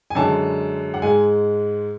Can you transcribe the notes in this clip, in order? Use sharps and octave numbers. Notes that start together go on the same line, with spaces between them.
G#5
F#2 D3 G#3 A5
F#5
G#2 G#3 G#5